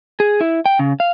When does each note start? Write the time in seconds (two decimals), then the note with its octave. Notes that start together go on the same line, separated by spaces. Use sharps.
0.20 G#4
0.41 E4
0.66 G5
0.79 C#3
1.00 F5